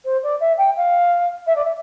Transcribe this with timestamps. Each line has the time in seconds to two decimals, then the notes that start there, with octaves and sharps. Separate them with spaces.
0.05 C5
0.23 D5
0.40 E5
0.58 G5
0.77 F5
1.47 E5
1.56 D5
1.65 E5